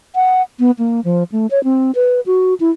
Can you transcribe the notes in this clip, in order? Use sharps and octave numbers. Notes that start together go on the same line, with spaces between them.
F#5
B3
A#3
F3
A3
C#5
C4
B4
F#4
E4